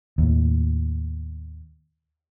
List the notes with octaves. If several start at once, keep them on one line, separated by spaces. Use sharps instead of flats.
D#2 A2